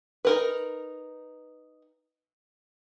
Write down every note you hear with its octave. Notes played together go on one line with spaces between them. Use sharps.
D#4 A#4 B4